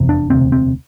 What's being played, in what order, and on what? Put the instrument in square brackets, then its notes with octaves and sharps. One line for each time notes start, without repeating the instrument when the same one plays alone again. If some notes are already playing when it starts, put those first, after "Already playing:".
Already playing: [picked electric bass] F1 E2 C3
D4
E1 D2 C3 C4
C4